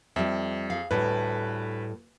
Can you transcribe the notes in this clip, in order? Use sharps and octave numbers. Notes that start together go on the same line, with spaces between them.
F2 G3 E5
G#4 F5
D2 A2 G3 B4